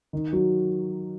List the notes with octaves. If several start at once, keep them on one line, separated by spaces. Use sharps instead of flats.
D#3
F#3 F#4